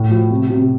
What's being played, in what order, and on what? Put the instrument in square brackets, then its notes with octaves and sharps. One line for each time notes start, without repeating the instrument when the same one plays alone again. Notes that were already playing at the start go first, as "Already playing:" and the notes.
Already playing: [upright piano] A2
F3
C3
C3